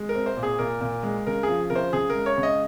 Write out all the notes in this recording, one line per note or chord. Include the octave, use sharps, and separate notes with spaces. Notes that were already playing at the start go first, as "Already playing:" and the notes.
Already playing: G#3
A#4
C4
C5
A#2
G#4
A#2 A#4
A#2
G#3
C#3 A#4
F3 G#4
C#3 A#4
C5
C#3 G#4
A#4
G#3
C#5
C#3
D#5